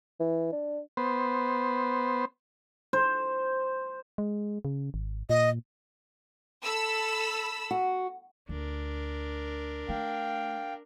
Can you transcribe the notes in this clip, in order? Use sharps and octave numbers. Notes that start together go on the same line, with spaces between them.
E3
D4
B3 C5
C5
G#3
C#3
G#1
A#2 D#5
A4 B5 E6
F#4
D2 D4 A#4
A3 F5 G5